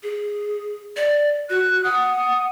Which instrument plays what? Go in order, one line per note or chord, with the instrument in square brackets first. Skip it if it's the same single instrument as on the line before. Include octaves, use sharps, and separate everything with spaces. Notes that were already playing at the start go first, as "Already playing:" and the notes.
[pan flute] G#4
D5
[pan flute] F#4 [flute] F#6
[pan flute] F#5 [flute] D#6